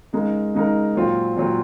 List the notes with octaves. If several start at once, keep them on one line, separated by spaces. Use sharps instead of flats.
C#3 G#3 D#4 A#4
C#3 G#3 D#4 A#4
A#2 F#3 C4 F4
A#2 F#3 C4 F4